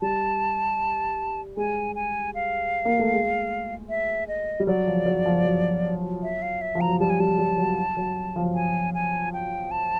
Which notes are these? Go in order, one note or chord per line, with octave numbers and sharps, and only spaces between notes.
G3 A5
G#3 G#5
G#5
F5
A#3
A3
G#3
E5
D#5
G3
F#3 D5
F3
F#3
F3
F#3
E5
F5
E5
F3
A#5
F#3
G3 A5
G#5
G3 A5
G3
F#3
F#3
F3
G#5
G#5
G5
A5